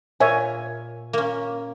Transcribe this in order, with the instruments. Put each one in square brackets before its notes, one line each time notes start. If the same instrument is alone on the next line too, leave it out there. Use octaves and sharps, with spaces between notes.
[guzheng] A#2 [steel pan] C#5 E5 G#5
[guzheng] A#3 C#4